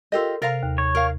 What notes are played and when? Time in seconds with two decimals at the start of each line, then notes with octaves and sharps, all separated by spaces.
0.12 F4 G4 A4 A#4 D#5 E6
0.42 C3 A#4 F5 A#5 A6 A#6
0.63 D#2
0.78 C#5
0.95 A#4 F5